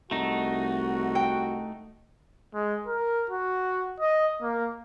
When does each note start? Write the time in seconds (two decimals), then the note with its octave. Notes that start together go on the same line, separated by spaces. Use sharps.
0.11 C2 A3 D#4 F#4
1.15 G5
2.54 G#3
2.87 A#4
3.30 F#4
4.00 D#5
4.42 A#3